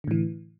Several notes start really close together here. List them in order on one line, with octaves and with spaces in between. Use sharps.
D3 A2 E3